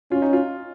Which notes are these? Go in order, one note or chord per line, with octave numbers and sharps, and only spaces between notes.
C#4 F4
D#4
F4